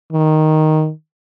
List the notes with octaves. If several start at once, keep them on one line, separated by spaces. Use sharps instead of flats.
D#3